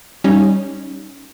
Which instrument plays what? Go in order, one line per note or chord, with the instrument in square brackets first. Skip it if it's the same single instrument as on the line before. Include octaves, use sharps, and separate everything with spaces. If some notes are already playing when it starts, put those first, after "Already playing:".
[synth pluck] G3 C#4 D#4